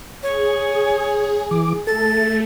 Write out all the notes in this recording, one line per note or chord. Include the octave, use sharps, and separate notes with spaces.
G#4 C#5
E3 D6
A3 A4 A6